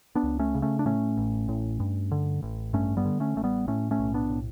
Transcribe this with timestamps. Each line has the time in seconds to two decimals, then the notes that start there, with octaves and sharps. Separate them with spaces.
0.15 B3 D4
0.23 C#2
0.39 A3 C#4
0.55 C#3
0.62 A3 C#4
0.79 D4
0.86 A2 A3 C#4
1.17 A1
1.49 A2
1.80 G2
2.11 D3
2.43 A1
2.73 G2 A3 C#4
2.97 G3 B3
3.05 D3
3.20 A3 C#4
3.36 A1 A3
3.44 G3 B3
3.68 A2 A3 C#4
3.91 A3 C#4
3.99 B1
4.14 B3 D4
4.30 A2